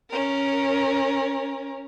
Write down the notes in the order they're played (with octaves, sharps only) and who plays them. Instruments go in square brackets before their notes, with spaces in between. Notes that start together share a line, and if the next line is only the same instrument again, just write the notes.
[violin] C#4 A#4